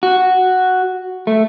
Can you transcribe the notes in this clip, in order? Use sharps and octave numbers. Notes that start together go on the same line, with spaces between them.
F#4
A3